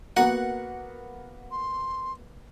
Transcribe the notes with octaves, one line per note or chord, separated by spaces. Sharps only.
A#3 B3 F#4 A#4 F#5 A#5
C6